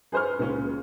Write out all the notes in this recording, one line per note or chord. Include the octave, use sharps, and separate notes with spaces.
G#4 B4 C5 C#6 F6
C#2 A#2 C#3 C#4